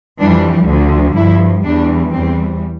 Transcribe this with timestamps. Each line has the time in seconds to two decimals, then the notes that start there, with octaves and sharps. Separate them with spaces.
0.19 F2 E3 G3 D4
0.67 D2 D3 F3
1.15 G2 F3 E4
1.63 E2 E3 G3 D4
2.11 E2 E3 G3 C4